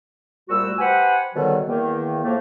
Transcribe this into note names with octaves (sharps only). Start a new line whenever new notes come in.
C2 A#2 G3 A3 F#4 E6
G4 B4 C5 F#5 G#5 B5
G#2 B2 D3 D#3 F#3 G3
E2 D#3 A#3
A2 F3 A3 A#3